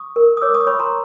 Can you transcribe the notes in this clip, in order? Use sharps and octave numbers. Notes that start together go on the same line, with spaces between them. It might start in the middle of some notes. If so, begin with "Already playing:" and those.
Already playing: C#6 D#6
A#4
D#6
C#5 D6 E6
C#6 D#6
C#5 B5 C#6
A#5 C6